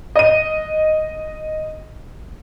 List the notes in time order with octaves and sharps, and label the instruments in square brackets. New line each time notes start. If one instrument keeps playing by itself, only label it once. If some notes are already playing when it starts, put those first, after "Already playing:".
[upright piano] D#5 D#7